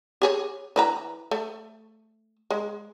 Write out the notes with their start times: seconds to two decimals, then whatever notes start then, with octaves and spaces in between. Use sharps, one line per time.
0.22 G4 G#4 C#5
0.76 E3 B4 A#5
1.31 A3
2.51 G#3